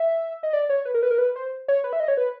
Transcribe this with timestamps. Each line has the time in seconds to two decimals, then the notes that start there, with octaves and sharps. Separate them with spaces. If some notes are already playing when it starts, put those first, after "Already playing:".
Already playing: E5
0.43 D#5
0.53 D5
0.69 C#5
0.85 B4
0.94 A#4
1.03 B4
1.11 A#4
1.18 B4
1.36 C5
1.68 C#5
1.84 B4
1.93 E5
2.00 D#5
2.08 C#5
2.17 B4